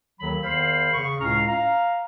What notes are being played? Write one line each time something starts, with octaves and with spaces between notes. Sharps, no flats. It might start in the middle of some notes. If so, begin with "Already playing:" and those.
D#2 D#3 F#3 A4 B5
E2 D#3 C5 F5 B5
C#3 C#6
C#2 A2 C#4 F5 A#5 F6
F5 A#5